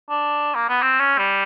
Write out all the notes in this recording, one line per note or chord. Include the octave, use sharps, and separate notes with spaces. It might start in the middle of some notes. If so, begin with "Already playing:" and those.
D4
A#3
B3
C4
C#4
G3